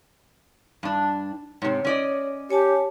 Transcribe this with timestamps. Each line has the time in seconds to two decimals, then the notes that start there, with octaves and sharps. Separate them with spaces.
0.83 G2 D4
1.62 G#2 C3 C#5
1.85 C#4 D5 D#5
2.50 G4 C#5 G#5 A5